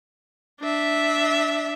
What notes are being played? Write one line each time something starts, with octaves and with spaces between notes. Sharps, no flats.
D4 E5